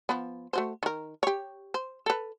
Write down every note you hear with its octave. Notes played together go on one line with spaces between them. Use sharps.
F3 B3
A3 F#4 C5
D#3 A#4
G4 C#5
C5
A4 B4